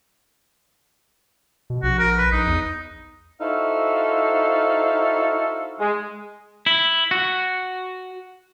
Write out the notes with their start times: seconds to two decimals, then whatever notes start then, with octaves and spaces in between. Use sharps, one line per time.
1.70 B2
1.83 A#1 F#4
1.99 A#4
2.18 B4
2.32 A#1 D#4
2.47 E2
3.40 D#4 E4 F#4 A4 C5 F5
5.80 G#3
6.66 E4
7.11 F#4